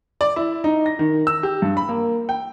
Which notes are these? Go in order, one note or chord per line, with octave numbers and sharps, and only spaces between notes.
D5
E4
D#4
A#6
D#3
E6
G4
G2
B5
A#3
G5